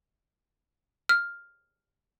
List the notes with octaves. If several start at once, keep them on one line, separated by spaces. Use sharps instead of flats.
F6